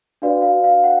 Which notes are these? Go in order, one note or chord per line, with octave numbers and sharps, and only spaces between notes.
D4 F#4 B4 D5 F5
F5
F5
F#5